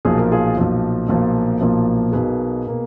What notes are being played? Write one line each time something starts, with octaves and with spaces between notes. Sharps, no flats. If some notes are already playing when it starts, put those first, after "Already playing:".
B1 A#2 F3 G#4
A#4
F4 G#4
B1 A#2 F3
B1 A#2 F3 A#3
B1 A#2 F3 A#3
B1 B2 A#3 G#4 B4
B2 A#3